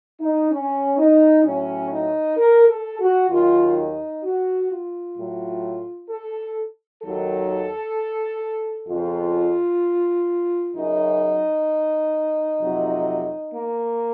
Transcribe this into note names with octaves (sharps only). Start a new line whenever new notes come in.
D#4
C#4
D#4
A2 F#3 C#4
D#4
A#4
A4
F#4
D#2 D#3 F#3 F4
D#4
F#4
F4
A2 F#3
A4
D#2 D#3 F#3 A4
F2 C#3 F3 F4
F#2 C#3 F#3 D#4
F2 C3 F#3
A#3